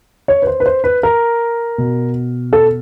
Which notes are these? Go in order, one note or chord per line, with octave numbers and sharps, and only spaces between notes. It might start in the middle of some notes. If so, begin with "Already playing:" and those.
C#5
B4
C5
B4
C5
B4
A#4
B2
A4